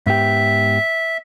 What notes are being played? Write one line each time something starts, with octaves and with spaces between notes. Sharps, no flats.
G#2 B3 G4 E5